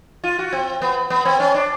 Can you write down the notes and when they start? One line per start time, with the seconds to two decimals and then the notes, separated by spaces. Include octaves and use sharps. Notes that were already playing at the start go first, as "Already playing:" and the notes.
0.24 F4
0.39 F#4
0.53 C4
0.82 B3
1.10 B3
1.25 C4
1.40 C#4
1.54 D4